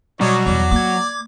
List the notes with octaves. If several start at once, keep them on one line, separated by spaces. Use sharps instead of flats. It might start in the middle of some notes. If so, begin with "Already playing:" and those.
B2 F#3 G3 D#4 C#5 D5
E2 D5
A#3 D6 G#6